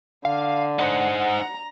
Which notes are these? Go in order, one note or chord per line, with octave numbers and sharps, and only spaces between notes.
D3 F5
D#4 C5 F#5
A#5